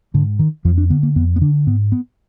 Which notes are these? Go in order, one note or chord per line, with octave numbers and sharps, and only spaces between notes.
G#2 D3
D#3
F2 F3
D4
D3 B3
A#3
F2 B3
B3
D3 D4
G#2 B3
B3